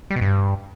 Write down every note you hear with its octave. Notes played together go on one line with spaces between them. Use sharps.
G3
B2
G2